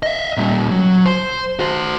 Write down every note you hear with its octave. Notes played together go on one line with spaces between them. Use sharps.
D#5 E5
A#2 G3
F#3
C5
F#4 C5